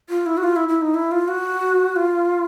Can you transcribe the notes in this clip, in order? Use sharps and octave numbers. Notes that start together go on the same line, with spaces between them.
F4
E4
F#4
F4
E4
E4
D#4
E4
F4
F#4
F4